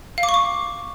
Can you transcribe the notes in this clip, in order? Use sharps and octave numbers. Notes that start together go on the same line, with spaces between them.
F5
D6
C#6
D6